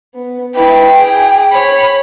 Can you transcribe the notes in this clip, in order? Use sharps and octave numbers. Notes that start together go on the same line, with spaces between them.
B3
E4 B4 G5
G#4
C#5 B5